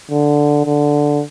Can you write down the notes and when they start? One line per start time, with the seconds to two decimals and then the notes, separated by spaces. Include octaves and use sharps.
0.11 D3
0.65 D3